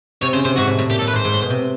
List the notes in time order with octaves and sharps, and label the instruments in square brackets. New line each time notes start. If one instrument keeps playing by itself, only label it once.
[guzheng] C3 [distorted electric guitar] C#5
[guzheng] C#3 [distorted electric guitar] C5
[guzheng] C3 [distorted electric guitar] C5
[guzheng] G#2 [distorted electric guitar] F#4
[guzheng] A2
A2
[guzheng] A#2 [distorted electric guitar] G4
[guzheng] A2 [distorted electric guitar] A4
[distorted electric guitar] B4
[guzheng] G#2 [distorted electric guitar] C5
[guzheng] G#2
A2
B2
C3